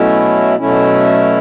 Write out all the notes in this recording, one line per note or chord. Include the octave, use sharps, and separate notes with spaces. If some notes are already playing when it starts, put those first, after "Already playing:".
Already playing: B2 F#3 A3 C#4 E4
B2 F#3 A3 C#4 E4